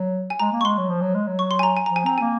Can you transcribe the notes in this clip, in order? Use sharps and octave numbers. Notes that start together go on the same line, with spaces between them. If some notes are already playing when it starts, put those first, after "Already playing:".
Already playing: F#3
G#5
G#3 A#5
A#3
C#6
G#3 C6
F#3
F3
F#3
G#3
F#3
C#6
C6
G#5
A#5
G#5
F3 A#5
G#5
C4 A#5
G#5
A#3